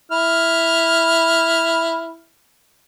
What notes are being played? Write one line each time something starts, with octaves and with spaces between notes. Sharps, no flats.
E4 F6